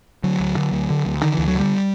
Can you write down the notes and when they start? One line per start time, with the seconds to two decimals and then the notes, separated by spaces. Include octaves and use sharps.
0.24 D3 F#3
0.40 D2
0.57 D3
0.73 D2
0.90 D3
1.06 D2
1.22 D3 D#3
1.35 D2 E3
1.48 F#3
1.55 D3 G3